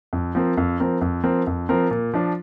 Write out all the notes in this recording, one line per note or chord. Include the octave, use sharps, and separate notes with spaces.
F2
F3 C4 A#4
F2
F3 C4 A#4
F2
F3 C4 A#4
F2
F3 C4 A#4
A#2
F3 D4